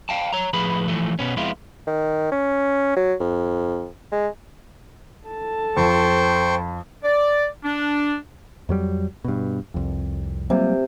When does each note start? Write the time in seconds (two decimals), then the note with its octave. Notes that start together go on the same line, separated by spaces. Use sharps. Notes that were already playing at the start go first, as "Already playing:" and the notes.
0.09 F5 G5 A5
0.33 C#5 A#5
0.53 A2 F3 G#4 B4 B5
0.88 E3 F3 A3
1.19 B2 B3 C#4
1.37 F2 G#3 B3 E4 F4
1.87 D#3
2.32 C#4
2.96 F#3
3.20 F2
4.12 G#3
5.27 A4 A5
5.77 F2 C5 G5 C#6
7.03 D5
7.64 D4
8.69 F2 F#3 G3
9.24 G2 B2
9.74 C2 F2
10.50 C3 F#3 G3 A#3